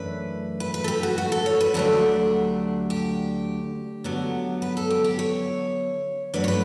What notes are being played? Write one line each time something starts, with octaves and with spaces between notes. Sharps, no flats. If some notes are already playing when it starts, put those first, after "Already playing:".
Already playing: F#2 E3 A3 D4 B4
B4
B4
A4
G4
F#4
F#4
A4
C#5
B4
D2 D3 F#3 A3 D4 G4
G4
D3 F#3 B3
B4
A4
G4
G4
C#5
G2 F#3 A3 D4 B4
C#5
B4